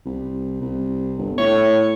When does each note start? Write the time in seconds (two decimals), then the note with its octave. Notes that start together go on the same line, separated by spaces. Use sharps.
0.06 C2
0.61 C2
1.18 G1
1.38 A2 C#5